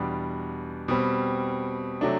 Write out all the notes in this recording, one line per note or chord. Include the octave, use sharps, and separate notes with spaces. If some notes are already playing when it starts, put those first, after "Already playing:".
Already playing: E2 B2 G3 D4
B2 G3 C4
C3 F#3 A3 D4